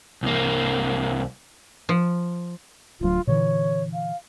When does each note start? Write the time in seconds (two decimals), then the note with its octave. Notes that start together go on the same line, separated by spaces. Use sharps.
0.23 C2 A#3
1.89 F3
3.01 D1 D2 F#3 F4
3.27 A#2 D3 E3 C#5
3.94 F5